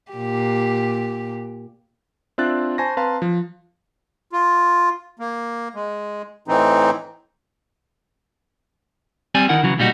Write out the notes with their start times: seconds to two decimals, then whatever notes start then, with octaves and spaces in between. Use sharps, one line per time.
0.12 A#2 G4
2.38 C4 D4 F4 E5 F#6 A6
2.78 C5 G#5 A5 B5 C#6 A#6
2.97 C4 B4 F5 A5 A#5 C6
3.22 F3
4.33 F4
5.19 A#3
5.75 G#3
6.48 A2 E3 C4 D#4
9.35 G3 C4 D5 G#5
9.49 D#3 D#4 E4 A#4 F#5
9.63 C#3 E3 F#3
9.78 B1 A#2 G3 D#4 F4 F#4